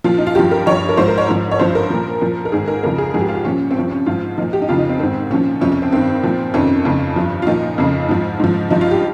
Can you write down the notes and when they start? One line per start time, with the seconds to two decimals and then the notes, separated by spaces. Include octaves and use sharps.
0.04 A#2 F3 F4
0.18 D#4
0.27 F4
0.35 G2 F3 G4
0.51 A#4
0.66 G2 F3 C#5
0.89 A#4
0.97 G#2 F3 C5
1.08 A#4
1.18 C#5
1.29 G#2 F3
1.51 C#5
1.59 G2 F3 C5
1.75 A#4
1.90 A#2 F3
2.21 A#2 F3
2.45 A#4
2.52 G#2 D#3 G#4
2.68 A#4
2.83 F2 C#3 F3 A#4
2.98 G#4
3.14 G#2 F3 G#4
3.20 G4
3.28 F4
3.35 G4
3.45 A#2 F3 C#4
3.71 C4
3.76 G2 F3 C#4
3.91 C#4
4.06 G#2 F3 F4
4.38 A#2 F3 D#4
4.53 G4
4.62 D#4
4.69 F2 C#3 F3 F4
4.79 D#4
4.89 C4
4.99 G#2 D#3 C4
5.31 A#2 F3 C#4
5.61 F2 C3 F3 C#4
5.72 C#4
5.82 C4
5.92 G2 D#3 C4
6.23 A#2 F3
6.54 F2 C3 D#3 C#4
6.85 F2 C#3 F3
7.16 G2 F3
7.42 F4
7.47 A#2 F3 D#4
7.78 F2 C#3 F3
8.09 G#2 F3
8.40 G#2 F3
8.70 G2 F3 D#4
8.81 F4
8.91 G4